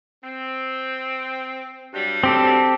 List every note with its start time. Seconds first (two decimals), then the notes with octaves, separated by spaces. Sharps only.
0.23 C4
1.93 G2 F#3 G3
2.24 C4 G4 A4